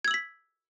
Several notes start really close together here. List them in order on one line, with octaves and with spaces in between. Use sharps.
G#6 E6 F#7 B6